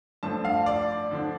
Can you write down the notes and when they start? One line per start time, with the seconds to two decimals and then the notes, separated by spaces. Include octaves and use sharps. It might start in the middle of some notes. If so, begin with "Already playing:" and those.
0.23 G2 F3 A3 D4 A5
0.45 F5
0.66 D5
1.11 D3 F3 D4